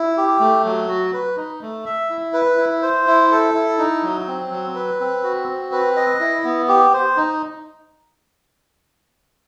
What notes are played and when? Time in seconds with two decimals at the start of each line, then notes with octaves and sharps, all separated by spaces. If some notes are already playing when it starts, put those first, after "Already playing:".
Already playing: E4
0.17 G4
0.40 A3
0.65 F#3
0.88 F#4
1.13 B4
1.37 D#4
1.62 A3
1.85 E5
2.10 E4
2.33 B4
2.58 E4
2.82 C5
3.07 E4
3.31 A4
3.54 E4
3.78 D#4
4.03 F#3
4.27 C4
4.51 F#3
4.75 B4
5.00 C4
5.23 F#4
5.48 C4
5.72 B4
5.96 D#5
6.20 E4
6.44 B3
6.68 G4
6.93 C5
7.17 D#4